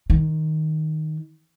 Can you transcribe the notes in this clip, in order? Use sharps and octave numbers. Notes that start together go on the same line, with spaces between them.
D#3